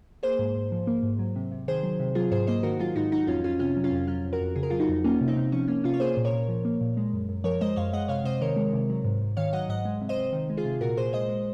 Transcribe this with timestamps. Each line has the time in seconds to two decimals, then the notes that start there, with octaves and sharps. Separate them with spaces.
0.23 A#3 G#4 C5
0.39 G#2
0.55 G#2
0.72 F3
0.87 A#3
1.03 G#2
1.19 F#3
1.36 C3
1.52 C3
1.68 D#3 G#4 C5
1.83 F#3
1.99 C3
2.15 F#3 F4 G#4
2.31 G#2 G#4 C5
2.47 A#3 C5 D#5
2.63 D#3 F#4 A#4
2.79 F#3 F4 G#4
2.96 G#2 D#4 F#4
3.12 F#3 D#4 F#4
3.27 F2 C#4 F4
3.44 F2 C#4 F4
3.59 C3 C#4 F4
3.77 F#3
3.84 C#4 F4
3.92 F2
4.07 F#3 C#4 F4
4.24 F2
4.33 F#4 A#4
4.41 F2
4.56 C#3 G#4
4.63 A#4
4.70 F#3 F4 G#4
4.80 D#4 F#4
4.89 F2
5.04 A#3 C#4 F4
5.21 C3
5.28 C4 D#4
5.36 C3
5.52 F3 C#4
5.68 A#3 C#4
5.84 C3 C#4 F4
5.94 C#5
6.00 A#3 G#4 C5
6.17 A#2
6.24 A#4 C#5
6.33 A#2
6.49 F3
6.65 A#3
6.81 A#2
6.97 G#3
7.13 F#2
7.29 F#2
7.44 F3 A#4 C#5
7.61 G#3 C5 D#5
7.76 F#2 C#5 F5
7.93 G#3 D#5 F#5
8.08 C3 C#5 F5
8.24 C3 C5 D#5
8.41 D#3 A#4 C#5
8.56 G#3
8.73 C3
8.90 F#3
9.05 G#2
9.21 G#2
9.37 D#3 C#5 F5
9.53 F#3 D#5 F#5
9.69 G#2 D#5 F#5
9.85 G#3
10.01 C3
10.09 C5 D#5
10.18 C3
10.33 D#3
10.50 G#3
10.57 F4 G#4
10.65 C3
10.81 A#2 F#4 A#4
10.97 A#2 G#4 C5
11.13 G#3 C5 D#5
11.29 G#3